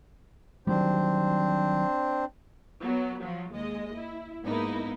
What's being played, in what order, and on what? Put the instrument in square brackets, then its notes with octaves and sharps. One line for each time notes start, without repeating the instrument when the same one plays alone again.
[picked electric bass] D#3 F#3 G3 [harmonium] C4 D4 C5
[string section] F#3 B3
F3 F#3
D#2 G#3 D#5
E4
G#2 A#3 B3 D#4 E4